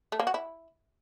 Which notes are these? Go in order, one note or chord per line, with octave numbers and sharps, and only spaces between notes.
A3
A#3
F#4
E4